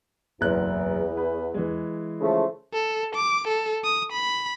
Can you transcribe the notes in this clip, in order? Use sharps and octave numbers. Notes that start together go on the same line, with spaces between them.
F#1 B1 E2 F#6
B4
E3 G#3
C#3 F3 A3
A4
D6
A4
D#6
B5